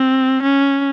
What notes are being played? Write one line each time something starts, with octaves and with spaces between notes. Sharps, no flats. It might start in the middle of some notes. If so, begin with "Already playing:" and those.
Already playing: C4
C#4